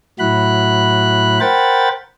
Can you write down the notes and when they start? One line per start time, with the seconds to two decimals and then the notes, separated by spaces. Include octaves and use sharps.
0.19 A2 F#3 E4 F#4 B5 F#6
1.40 A#4 C5 F#5 G5 B5 A6